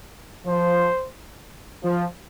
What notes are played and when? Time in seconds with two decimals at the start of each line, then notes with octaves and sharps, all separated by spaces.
0.46 F3 C5
1.83 F3